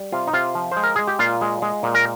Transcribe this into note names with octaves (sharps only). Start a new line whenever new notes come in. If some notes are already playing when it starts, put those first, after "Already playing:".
Already playing: G3
C3 F4
D#4
C3 F4
F3
G#3 C5
A#4
G#3 G#4
G4
A#2 F4
G#3
G#3
A#2
A#4